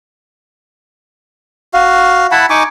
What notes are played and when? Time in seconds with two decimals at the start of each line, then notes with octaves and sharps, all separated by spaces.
1.74 F#4 F5
2.32 E4 F#5 A5 B5
2.50 D#4 G#5 C#6 D6